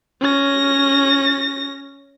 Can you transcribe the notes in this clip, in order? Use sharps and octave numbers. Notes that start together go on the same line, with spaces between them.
C#4 A#6